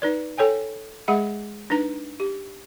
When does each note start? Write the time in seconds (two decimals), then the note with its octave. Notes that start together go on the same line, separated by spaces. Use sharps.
0.02 D#4 B4 D5
0.38 A4 C#5 G5 G#5
1.08 G#3 G#4 E5 F#5 B5
1.70 D4 D#4 B4 A#5
2.20 G4